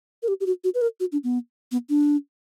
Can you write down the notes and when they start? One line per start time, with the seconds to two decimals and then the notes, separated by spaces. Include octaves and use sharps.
0.23 A#4
0.28 G4
0.40 G4
0.46 F#4
0.64 F#4
0.74 B4
0.81 A#4
1.00 F#4
1.12 D4
1.24 B3
1.72 B3
1.89 D4